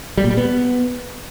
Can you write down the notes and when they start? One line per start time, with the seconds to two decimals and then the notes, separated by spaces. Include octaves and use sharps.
0.18 G3
0.24 A#2
0.31 G3
0.37 B3